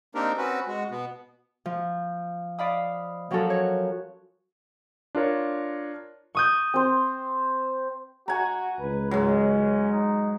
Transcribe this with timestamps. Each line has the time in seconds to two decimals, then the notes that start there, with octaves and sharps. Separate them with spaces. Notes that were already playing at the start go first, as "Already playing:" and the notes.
0.15 A#3 C4 D4 D#4 G4 A#4
0.37 C4 C#4 F#4 B4
0.67 G#3 F#4
0.91 B2 B3
1.66 F3
2.59 D5 F5 B5 D#6
3.31 F3 F#3 C#4 F#4 A4 A#4
3.50 C#5
5.15 D4 F4 A#4 C#5
6.35 C#6 D#6 G6
6.74 C4 C5
8.28 F#4 G#5 A#5
8.80 C#2 B4
9.11 G#2 F#3 C#4
9.92 D#4